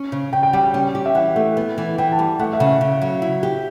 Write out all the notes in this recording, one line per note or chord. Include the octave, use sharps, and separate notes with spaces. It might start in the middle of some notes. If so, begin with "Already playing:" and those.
Already playing: C#4
C#3
C#3 G5
G5
G3 G5
G5
C#4
G4
E5
E3 F#5
A3
B3
E3
E3 G5
A5
G3
A3 F#5
E5
C#3
E5
C#3
F#3
E4
G4